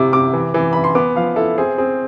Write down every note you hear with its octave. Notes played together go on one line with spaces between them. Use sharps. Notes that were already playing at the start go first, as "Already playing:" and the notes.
Already playing: C3 E4 D6
C3 D6
E3
E3
E3 B5
C6
B3 D6
F3 F5
E4 A4
C4 G#4
C4 G#4